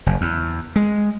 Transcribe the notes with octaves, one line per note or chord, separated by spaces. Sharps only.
F#1
E2
G#3